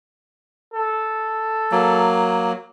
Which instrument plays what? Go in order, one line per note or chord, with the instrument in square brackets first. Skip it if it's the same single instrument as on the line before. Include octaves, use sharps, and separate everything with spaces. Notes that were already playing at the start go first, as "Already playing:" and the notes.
[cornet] A4
[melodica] F#3 A#3